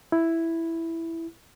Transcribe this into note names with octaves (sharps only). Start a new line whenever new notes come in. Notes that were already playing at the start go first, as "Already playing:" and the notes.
E4